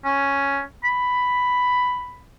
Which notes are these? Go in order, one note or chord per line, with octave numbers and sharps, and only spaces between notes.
C#4
B5